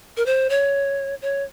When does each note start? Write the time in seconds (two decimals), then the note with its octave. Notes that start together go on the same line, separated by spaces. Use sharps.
0.17 A#4
0.26 C5
0.50 C#5
1.22 C#5